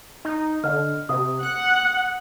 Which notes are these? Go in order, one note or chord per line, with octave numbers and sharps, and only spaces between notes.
D#4
D3 D#5 F6
C3 D#6
F#5 F#6